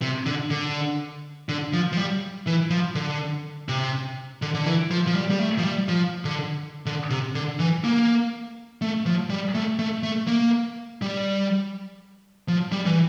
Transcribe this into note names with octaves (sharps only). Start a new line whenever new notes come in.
C3
D3
D3
D3
F3
F3
G3
E3
F3
D3
C3
D3
D3
E3
F3
F3
G3
G3
A3
F3
G3
F3
D3
D3
C3
D3
E3
A#3
A3
F3
G3
A3
A3
A3
A#3
G3
F3
G3
E3